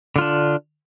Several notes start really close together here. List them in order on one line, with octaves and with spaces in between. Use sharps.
D3 F4 D4